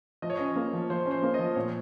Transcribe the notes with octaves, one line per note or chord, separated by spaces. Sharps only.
F3 D#5
C#5
C#4 D#5
A#3
F3
F3 C5
C#4
C5
A#3
F3 D#5
A#2 C#5